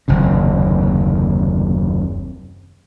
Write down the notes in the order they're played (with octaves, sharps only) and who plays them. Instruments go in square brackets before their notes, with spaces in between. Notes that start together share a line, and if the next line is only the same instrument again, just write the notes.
[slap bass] F#1 D#2 C3